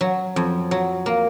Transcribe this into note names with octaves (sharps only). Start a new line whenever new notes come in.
F#3
F2
F#3
A#3